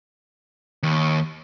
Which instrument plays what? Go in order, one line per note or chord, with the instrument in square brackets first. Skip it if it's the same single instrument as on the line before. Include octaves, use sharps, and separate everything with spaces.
[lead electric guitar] D#2